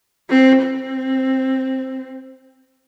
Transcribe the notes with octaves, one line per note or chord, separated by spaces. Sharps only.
C4
C4